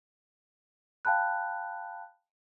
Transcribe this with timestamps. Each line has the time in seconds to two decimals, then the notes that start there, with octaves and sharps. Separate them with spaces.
1.05 F5 G5 A5 B5 F#6